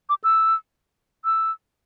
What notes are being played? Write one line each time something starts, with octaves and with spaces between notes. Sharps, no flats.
D6
E6
E6